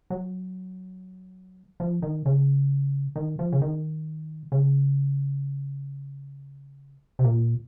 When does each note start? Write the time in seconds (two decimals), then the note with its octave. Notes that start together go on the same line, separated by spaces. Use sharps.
0.10 F#3
1.80 F3
2.02 D#3
2.26 C#3
3.16 D#3
3.39 F3
3.52 C#3
3.62 D#3
4.52 C#3
7.19 C3
7.24 A#2